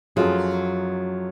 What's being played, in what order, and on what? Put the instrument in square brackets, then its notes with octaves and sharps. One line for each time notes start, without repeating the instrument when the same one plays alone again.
[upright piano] F#2 F3 A3 F4 G#4 [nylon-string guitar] F#3